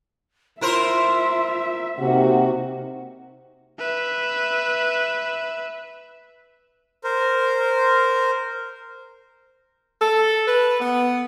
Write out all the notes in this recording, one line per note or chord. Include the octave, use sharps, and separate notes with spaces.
E4 F4 A#4 C5 E5
C3 A#3 D#4 F#4
B4 E5
A#4 C5
A4
B4
B3